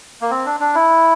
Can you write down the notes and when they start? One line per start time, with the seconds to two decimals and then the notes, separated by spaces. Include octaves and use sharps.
0.21 A#3
0.31 C4
0.46 D4
0.60 D4
0.75 E4